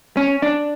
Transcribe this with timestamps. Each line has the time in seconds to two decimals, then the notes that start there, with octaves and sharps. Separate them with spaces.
0.17 C#4
0.42 D4